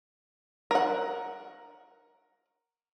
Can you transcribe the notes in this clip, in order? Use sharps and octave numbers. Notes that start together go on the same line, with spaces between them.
A#4 F#5